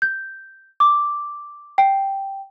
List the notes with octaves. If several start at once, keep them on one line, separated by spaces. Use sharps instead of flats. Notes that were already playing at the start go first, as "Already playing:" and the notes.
G6
D6
G5